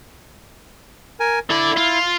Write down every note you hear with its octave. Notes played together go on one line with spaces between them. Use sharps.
A#4 G#5
D3 E4 D5
F4